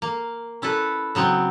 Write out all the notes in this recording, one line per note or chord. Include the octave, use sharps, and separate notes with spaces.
A#3
C#4 E4 A4 B4
C#3 F#3 B3 C4